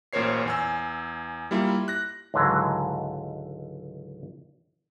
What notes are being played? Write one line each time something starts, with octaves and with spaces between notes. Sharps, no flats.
A1 A#2 A#4 C5 C#5 C7
E2 G#5 E6
G3 A#3 E4 F4
F#6 A#6
C#2 G#2 D3 E3 F#3